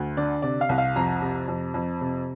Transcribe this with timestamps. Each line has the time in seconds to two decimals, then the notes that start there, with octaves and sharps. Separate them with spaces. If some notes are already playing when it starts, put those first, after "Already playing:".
Already playing: D2
0.17 D3 D5
0.42 C3 D5
0.61 F5
0.69 C2
0.78 F5
0.96 F2 A#5
1.22 C3
1.48 F2
1.74 F2
2.01 C3